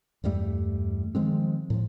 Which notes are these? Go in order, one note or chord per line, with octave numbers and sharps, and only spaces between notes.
E2 G2 G3 A3
D#3 F3 G#3 C4
A2 F3